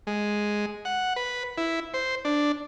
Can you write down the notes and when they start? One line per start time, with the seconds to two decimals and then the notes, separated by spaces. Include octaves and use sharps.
0.07 G#3
0.85 F#5
1.16 B4
1.58 E4
1.94 C5
2.25 D4